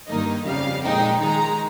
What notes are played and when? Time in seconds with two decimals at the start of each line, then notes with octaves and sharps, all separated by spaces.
0.09 G2 D#3 A#3 D#4 D#5
0.46 F2 C#3 G3 F5
0.84 A#2 G#3 D#4 G5
1.21 D#3 G#3 D#4 A#5